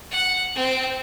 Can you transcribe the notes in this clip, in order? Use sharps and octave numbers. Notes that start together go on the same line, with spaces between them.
F#5
C4